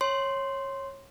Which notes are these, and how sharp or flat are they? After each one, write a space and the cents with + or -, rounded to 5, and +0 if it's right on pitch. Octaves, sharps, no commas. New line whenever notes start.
C#5 -20 C6 +0